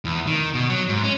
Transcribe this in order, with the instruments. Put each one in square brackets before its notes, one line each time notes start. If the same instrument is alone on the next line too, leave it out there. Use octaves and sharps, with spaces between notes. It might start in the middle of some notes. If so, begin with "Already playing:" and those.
[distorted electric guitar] E2
D#3
B2
F#3
G#2
C#4